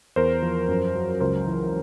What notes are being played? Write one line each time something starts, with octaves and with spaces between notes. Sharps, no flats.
E2 A#4 C5
F3
F#2
F#3
C#2 A#4 C5
E3